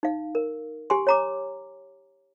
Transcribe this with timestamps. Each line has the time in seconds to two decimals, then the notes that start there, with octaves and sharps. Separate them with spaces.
0.03 D#4 F5
0.35 A#4
0.90 G4 G#5 C6
1.07 C#5 A#5 D6